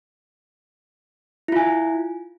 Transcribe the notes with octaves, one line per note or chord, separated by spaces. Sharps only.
E4 F4 G#5